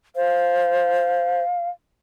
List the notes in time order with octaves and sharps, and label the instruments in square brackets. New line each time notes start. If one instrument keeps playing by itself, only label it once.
[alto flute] C5 [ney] F5